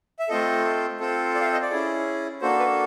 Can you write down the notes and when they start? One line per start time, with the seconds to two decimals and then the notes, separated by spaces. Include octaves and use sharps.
0.19 E5
0.29 A3 C4 F4 A4 D#5
1.00 C4 F4 A4
1.35 D5
1.41 F5
1.44 E5
1.53 D#5
1.62 D5
1.71 C#4 E4 G#4
2.41 A#3 D4 F#4 A4 C5
2.59 B4